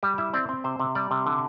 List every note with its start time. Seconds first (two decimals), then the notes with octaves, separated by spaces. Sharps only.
0.03 G3 G4
0.18 E4 E5
0.34 C4 D5
0.49 C4
0.64 C3 C5
0.80 C3
0.95 G3 D5
1.11 C3
1.26 D3